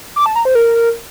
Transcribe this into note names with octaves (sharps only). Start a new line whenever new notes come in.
D6
A5
A#5
C5
A#4